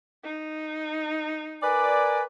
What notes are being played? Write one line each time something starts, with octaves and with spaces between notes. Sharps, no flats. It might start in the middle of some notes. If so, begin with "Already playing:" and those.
D#4
A#4 B4 D5 G#5